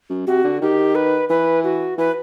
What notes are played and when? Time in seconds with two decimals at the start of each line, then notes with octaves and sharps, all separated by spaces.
0.10 F#2
0.27 C3 F#4
0.44 D3
0.62 D#3 G4
0.95 B4
1.29 E3 B4
1.64 F#4
1.98 E3 B4